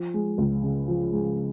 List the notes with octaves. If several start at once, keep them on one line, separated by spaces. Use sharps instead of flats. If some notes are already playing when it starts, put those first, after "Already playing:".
Already playing: F3
G#3
C#2
C#3
F3
G#3